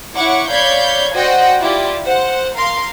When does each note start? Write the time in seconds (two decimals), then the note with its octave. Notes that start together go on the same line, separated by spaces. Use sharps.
0.16 E4 C#5 F#5 C#6 D6
0.49 C#5 D5 F5 B5 G6 G#6
1.14 F#4 C5 D5 D#5 F#5 G5
1.60 E4 F4 G4 D5
2.05 C5 F#5
2.55 A#4 F5 C6